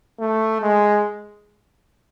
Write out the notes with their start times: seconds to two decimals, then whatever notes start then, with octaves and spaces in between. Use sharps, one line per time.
0.20 A3
0.62 G#3